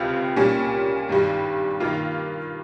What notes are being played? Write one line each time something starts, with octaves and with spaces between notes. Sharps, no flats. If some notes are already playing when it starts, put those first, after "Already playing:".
Already playing: C#2 C3 F3 C4 F4
A#2 G3 A#3 C#4
G#1 G2 G3
G2 D#3 A#3 F4